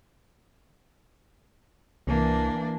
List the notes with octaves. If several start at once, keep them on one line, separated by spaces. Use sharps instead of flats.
C2 E3 A#3 D4